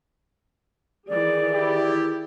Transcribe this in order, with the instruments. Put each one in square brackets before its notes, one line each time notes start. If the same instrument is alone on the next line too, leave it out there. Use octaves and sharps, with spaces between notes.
[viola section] D#3 E3 G#4 [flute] D5
[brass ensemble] E4 G4